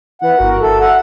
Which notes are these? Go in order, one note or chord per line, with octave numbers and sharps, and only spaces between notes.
E3 B4 F#5
G1 F#4 A#4
A4 E5 E6
F#5